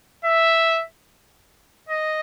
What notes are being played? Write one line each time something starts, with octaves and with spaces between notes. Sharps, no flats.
E5
D#5